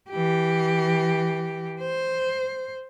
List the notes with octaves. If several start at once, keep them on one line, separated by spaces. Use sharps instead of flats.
E3 G4
C5